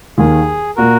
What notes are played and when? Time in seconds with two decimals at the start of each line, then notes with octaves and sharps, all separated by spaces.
0.18 D#2 D#3 A#3 G#4
0.76 A#2 A#3 F#4 A#4